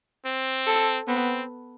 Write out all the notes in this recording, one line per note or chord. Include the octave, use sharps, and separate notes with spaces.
C4
A4
B3 C4